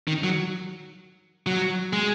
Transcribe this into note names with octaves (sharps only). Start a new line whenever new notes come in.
D#3
F#3
F#3
G#3